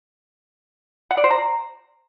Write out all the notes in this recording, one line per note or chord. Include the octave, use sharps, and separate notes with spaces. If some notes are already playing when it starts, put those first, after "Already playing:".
F#5
D5
C5
A#5